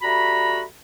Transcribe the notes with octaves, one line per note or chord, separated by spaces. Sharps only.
G3 A3 F#4 A#5 B5